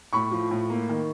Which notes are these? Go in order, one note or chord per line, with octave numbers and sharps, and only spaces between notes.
A2 B5 C#6
F3
A2
A#3
D#3